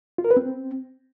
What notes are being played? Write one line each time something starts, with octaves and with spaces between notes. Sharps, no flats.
F4
A#4
B4
C4